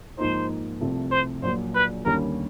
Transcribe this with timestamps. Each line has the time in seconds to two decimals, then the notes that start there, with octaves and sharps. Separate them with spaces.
0.18 G#2 F3 A#3 D#4 C5
0.80 C2 C3 F3 A3
1.11 C5
1.42 A#1 A#2 F#3 A#3 C5
1.74 B4
2.05 D#2 D3 G3 A#3 C#4 A#4